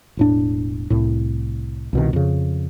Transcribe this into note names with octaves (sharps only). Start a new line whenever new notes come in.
E1 A2 D4
C2 A2
C2 B2 D#3
F2 C#3